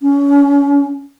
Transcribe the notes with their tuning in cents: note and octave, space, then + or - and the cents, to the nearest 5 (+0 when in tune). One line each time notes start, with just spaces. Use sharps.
C#4 +30